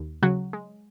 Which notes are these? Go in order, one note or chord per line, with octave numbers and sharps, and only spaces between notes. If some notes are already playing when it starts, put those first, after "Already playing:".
Already playing: D#2
C#3 F#3 F#4
G#3